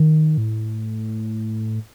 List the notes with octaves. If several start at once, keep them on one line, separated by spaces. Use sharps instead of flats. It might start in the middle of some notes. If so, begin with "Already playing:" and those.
Already playing: D#3
A2